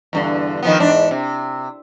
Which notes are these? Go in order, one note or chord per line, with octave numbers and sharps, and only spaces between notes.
E2 G2 D3
D#3 F3 B3
E2 G#2 D4
C3